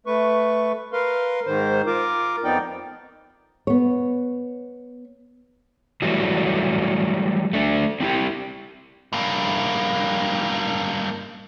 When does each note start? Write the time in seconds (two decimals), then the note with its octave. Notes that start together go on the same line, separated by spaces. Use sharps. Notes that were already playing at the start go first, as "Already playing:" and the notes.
0.06 A3 B4 C#6
0.93 A#4 B4 F5 C6
1.46 G#2 D#3 C5
1.87 F4 A#4 D6
2.44 F2 F3 B3 D#4 D5 G5
3.67 B3 C#5
6.02 E3 F#3 G3 A3
7.53 A3 D4
8.00 C4 E4 F4 G4
9.13 G2 A#3